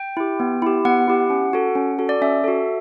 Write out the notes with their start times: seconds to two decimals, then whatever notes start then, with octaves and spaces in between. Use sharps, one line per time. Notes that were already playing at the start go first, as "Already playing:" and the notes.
Already playing: G5
0.17 E4 G4
0.40 B3
0.62 E4 G4
0.85 B3 F#5
1.08 E4 G4
1.30 C#4
1.53 F#4 A4
1.75 C#4
1.99 F#4 A4
2.09 D5
2.22 C#4 E5
2.44 F#4 A4